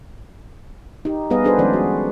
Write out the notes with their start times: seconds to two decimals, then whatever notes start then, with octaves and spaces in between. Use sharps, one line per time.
1.05 D#4 G4
1.30 G3 B3 G#4 B4 D#5 F5
1.44 D4 F#4 G#4 A4 B4 C5
1.58 D#3 F3 G#3 C#4 C5 D5
1.73 F#4